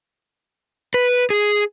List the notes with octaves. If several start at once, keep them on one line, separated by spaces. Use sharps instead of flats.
B4
G#4